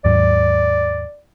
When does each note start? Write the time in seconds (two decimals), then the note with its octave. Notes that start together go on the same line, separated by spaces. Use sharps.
0.05 D#2 G#2 F#3 D5